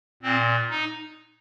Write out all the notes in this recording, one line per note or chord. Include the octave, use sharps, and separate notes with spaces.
A#2 C4
D#4